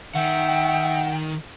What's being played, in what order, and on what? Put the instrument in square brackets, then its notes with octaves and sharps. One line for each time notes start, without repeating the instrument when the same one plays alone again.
[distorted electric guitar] D#3 [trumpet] E5 [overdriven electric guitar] F#5 [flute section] G5